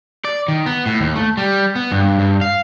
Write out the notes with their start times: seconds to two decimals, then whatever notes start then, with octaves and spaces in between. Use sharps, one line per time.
0.25 D5
0.48 D#3
0.66 B3
0.86 A2
1.00 D#2
1.16 A3
1.37 G3
1.76 B3
1.92 G2
2.19 G2
2.41 F5